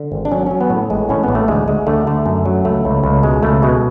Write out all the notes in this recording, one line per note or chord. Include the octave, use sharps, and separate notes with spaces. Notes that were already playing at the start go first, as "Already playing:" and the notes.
Already playing: D3
G#1
D4
F#3 C#4
F#3 C#4
B3
A2
A1 G#3
A2 C#4
A1 B3
A3
D2 G#3
D2 G#3
D2 A3
D3 A3
F#2
F#3
C#2 A3
C#2
C#2
B2 G#3
C#2 A3
B2 G#3